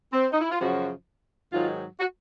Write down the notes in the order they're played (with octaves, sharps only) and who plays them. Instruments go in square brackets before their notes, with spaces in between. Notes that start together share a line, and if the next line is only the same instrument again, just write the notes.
[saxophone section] C4
D#4
E4
F4
F#2 C#3 F3 F#4
G#2 D#3 F#3 F4
F#4